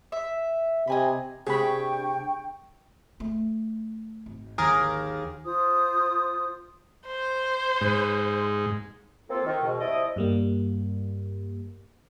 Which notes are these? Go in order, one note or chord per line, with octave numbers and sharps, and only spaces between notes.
E5
C3 D#5 G#5 B5
C3 D4 G#4 G5 B5 C#6
A3
G#1
D#2 G#4 A#4 A6
F4 C5 D#6
C5
G#2
A#3 C4 F4 A4
D#3
G#2 B2
F3 G3 C4 E4 D5 D#5
G2 G3 A#3